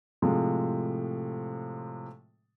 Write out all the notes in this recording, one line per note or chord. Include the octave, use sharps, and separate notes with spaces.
A2 C3 F3 G#3 A3